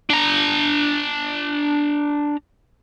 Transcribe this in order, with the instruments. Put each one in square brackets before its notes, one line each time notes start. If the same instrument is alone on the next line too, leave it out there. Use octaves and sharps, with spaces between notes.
[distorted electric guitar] D4 A#5